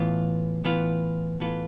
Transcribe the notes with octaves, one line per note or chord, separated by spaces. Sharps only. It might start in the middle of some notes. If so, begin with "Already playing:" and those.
Already playing: A2 E3 B3 F4
A2 E3 B3 F4
A2 E3 B3 F4